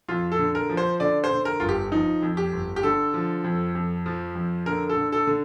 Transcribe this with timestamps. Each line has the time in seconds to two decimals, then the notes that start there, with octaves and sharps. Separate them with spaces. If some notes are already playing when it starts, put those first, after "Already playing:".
0.08 F2 F4
0.32 A4
0.39 D3
0.55 A#4
0.69 F3
0.77 C5
1.00 D3 D5
1.24 C5
1.31 D3
1.45 A#4
1.60 G1 F4
1.69 G4
1.92 F3 D#4
2.22 F2
2.37 G4
2.53 G1
2.76 G4
2.83 D3 A4
3.14 F3
3.44 F2
3.75 F2
4.06 F3
4.35 F2
4.66 D3 A#4
4.89 A4
4.97 D3
5.12 A4
5.27 D3